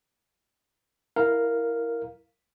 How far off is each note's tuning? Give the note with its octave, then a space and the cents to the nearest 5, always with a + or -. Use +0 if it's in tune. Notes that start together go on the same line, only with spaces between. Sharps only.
E4 +0 A#4 +0 F5 +0